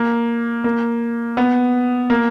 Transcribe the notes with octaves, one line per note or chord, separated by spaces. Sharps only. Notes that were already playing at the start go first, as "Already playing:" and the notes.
Already playing: A#3
A#3
B3
A#3